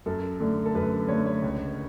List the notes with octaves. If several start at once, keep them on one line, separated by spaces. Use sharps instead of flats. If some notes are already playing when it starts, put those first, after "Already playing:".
F#2 A4
D3 A3
A4
F#2 B4
D3 A3 C#5
C#5
C#2